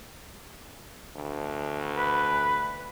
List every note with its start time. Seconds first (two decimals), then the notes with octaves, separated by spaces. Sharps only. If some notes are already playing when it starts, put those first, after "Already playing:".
1.15 D2
1.97 B4